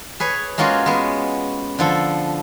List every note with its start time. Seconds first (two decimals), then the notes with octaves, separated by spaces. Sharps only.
0.20 G#4 B4 C#5
0.58 G#3 A#3 C#4 F4 F#4
0.86 G#3 B3
1.79 D3 F3 A4